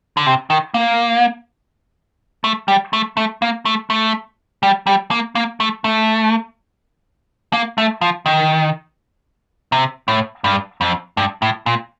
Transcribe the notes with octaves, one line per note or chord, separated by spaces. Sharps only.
D3
C3
D#3
A#3
A3
G3
A3
A3
A#3
A3
A3
G3
G3
A#3
A#3
A3
A3
A#3
A3
F3
D#3
C3
A2
G2
F2
G2
A2
A#2